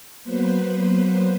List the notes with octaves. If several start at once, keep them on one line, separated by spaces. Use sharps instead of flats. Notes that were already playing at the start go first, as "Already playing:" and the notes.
F#3 A#3 B3 B4 C5